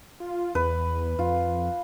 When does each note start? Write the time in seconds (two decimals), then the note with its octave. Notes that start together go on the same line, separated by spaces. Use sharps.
0.20 F4
0.55 E2 B4
1.19 F2 F4